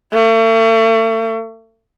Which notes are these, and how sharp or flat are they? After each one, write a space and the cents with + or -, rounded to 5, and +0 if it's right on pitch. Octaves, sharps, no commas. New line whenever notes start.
A3 +40